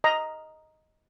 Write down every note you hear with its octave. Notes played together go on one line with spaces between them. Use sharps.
D#5 A#5